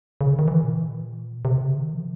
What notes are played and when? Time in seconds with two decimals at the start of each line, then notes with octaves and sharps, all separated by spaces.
0.21 C#3
0.30 D3
0.39 D#3
0.48 E3
0.64 A#2
1.45 C3
1.61 C#3
1.77 D#3
1.93 F3